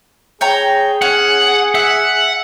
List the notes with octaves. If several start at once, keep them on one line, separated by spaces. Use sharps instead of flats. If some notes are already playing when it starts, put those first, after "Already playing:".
G#4 C#5 G5 A#5
C#4 F#5
E5 F#5